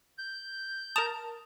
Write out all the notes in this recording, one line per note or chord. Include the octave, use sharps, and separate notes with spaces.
G6
A#4 A5 D#6 E7 F7